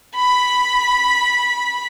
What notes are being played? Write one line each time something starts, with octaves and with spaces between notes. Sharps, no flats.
B5 B6